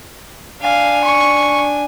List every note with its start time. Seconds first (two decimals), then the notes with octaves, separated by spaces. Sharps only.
0.61 D4 F5 G#5
1.04 C#6